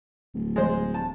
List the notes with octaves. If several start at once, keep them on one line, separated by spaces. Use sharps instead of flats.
D1
G#3 C5
A5